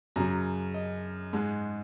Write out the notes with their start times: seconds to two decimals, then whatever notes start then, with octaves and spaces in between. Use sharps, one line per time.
0.16 F#2 C#3 F#3 A#5
0.74 D#5
1.33 G#2 G#3